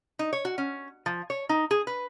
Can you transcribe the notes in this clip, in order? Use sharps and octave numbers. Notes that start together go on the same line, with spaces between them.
D#4
C#5
F#4
C#4
F3
C#5
D#4
G#4
B4